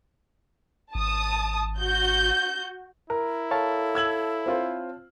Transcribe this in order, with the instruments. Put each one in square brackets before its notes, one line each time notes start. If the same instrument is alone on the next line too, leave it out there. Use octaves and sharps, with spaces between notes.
[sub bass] G#1 [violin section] A5 D#6
[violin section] F#4 G6
[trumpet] E4 [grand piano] A#4
[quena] A4 [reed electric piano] C#5 F5 A5
[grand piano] E6 G#6 F#7
C4 F4 C5